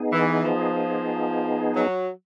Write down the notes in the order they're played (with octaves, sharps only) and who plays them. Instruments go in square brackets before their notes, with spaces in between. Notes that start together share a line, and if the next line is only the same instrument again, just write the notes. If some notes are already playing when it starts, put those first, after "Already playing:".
Already playing: [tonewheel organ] B3 D#4 G#4
[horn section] E3
F3
F#3